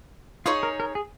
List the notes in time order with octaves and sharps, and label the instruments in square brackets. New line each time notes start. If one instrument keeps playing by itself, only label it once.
[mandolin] D#4 G#4 C#5 [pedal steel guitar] F4
[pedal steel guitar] A#4
A#4
G#4